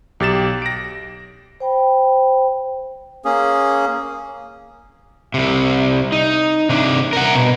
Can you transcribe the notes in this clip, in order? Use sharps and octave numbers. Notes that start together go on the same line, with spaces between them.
B1 G4 A6 E7
A#6 D7
C5 G5 B5
A#3 C#4 G#4
C2 C3
D#4
C3 D4
A#4 F#5
B2